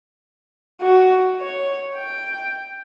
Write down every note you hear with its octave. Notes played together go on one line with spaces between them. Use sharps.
F#4
C#5
G5